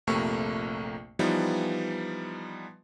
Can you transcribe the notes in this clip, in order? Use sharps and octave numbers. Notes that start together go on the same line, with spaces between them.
A#1 F2 C3 A3 A#3 C#6
E3 F3 G3 B3 D#4